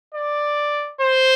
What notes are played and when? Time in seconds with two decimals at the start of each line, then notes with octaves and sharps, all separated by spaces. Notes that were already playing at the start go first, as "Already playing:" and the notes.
0.15 D5
1.01 C5